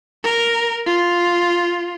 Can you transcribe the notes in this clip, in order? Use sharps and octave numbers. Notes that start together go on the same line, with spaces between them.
A#4
F4